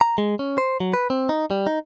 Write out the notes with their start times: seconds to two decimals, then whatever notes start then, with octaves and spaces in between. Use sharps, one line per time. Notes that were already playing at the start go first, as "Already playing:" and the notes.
0.01 A#5
0.18 G#3
0.39 C#4
0.58 C5
0.80 F#3
0.94 B4
1.10 C4
1.29 D#4
1.51 G3
1.67 D#4